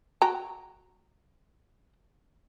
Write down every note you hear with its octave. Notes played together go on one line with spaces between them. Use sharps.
F#4 G5 A#5